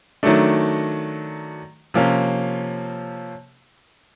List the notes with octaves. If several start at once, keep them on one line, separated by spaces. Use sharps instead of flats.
D#3 F#3 A3 D4
C3 F3 A#3 C#4